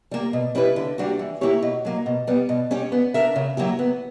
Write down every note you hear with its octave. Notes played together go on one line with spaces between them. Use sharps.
G3 A#3
B2
G3 C#4 E4 B4
D3
G3 A#3 D4 F#4
E3
A#3 E4 G4 C#5
B2
F#3 A#3
B2
G3 B3
B2
G3 C#4 G4 C#5
B3
D4 A#4 E5
C#3
F#3 A#3 E4 G4
B3